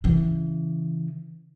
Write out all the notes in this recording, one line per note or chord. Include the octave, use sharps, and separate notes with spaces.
C#3 E3